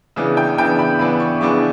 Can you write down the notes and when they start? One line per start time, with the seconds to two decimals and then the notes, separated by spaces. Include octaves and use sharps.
0.16 C#3 E3 B3 D4
0.37 G5
0.57 C#3 E3 B3 D4 G5
0.79 B5
0.99 C#3 E3 B3 D4 B5
1.20 C#6
1.41 C#3 E3 B3 D4 D6